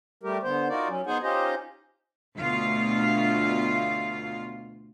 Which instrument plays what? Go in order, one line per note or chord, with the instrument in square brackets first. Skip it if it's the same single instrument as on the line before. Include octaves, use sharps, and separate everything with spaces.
[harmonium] G3 A3 G4 A#4
D3 B3 C5
D#4 F4 F#4 A#4 D5
F#3 C#4
B3 D#4 G#4 C5 F#5 G#5
C#4 D#4 F4 G4 C5 D#5
[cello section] D2 B2 F4 F5